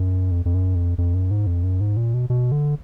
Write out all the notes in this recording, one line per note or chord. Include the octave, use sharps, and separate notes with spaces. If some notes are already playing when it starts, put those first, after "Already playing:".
Already playing: F#2
F2
F2
F#2
F2
F2
F#2
G#2
F2
F#2
G#2
A#2
B2
B2
D3